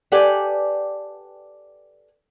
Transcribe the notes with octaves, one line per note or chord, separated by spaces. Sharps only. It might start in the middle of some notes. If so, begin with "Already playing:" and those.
G4 A4 B4 D5 G5 G#5